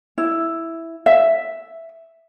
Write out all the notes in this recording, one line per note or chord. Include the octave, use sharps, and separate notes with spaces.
E4
E5